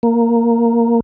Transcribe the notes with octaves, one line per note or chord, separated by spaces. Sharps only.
A#3